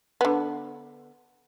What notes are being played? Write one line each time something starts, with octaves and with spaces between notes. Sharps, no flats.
D3 B3